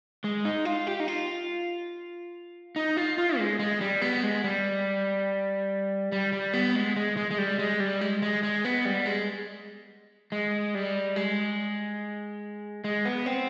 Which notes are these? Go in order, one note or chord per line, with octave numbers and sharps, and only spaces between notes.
G#3
D#4
F4
G4
D#4
F4
D#4
F4
F4
G#3
G#3
G3
B3
G#3
G3
G3
G3
B3
G#3
G#3
G#3
G#3
G3
G#3
G3
G#3
G#3
G#3
B3
G3
G#3
G#3
G3
G#3
G#3
B3
C4